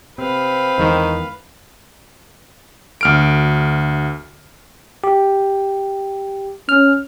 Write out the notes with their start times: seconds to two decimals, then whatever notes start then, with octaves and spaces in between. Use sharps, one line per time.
0.18 C3 C4 B4 F5
0.78 E2 D#3 E3 G#3
3.01 D2 F6 D7
5.04 G4
6.69 C#4 F6